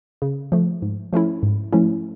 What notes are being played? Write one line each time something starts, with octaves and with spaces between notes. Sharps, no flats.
C#3
F3 A3
G#2
F3 A3 C#4 E4
G#2
F3 A3 C#4 E4